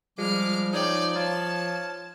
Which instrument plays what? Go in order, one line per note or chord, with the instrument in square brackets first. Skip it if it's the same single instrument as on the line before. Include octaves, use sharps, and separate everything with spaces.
[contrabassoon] F3 [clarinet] G3 [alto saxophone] G#3 [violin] D6 F6
[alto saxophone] D#4 [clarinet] C#5 [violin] D5 G5
[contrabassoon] F3 [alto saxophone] F4 [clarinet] C#5 [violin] A5